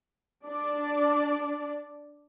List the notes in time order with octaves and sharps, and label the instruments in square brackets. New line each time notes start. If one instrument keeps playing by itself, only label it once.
[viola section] D4 D5